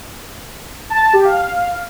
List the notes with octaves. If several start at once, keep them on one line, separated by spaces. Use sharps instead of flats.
A5
A5
G4
F5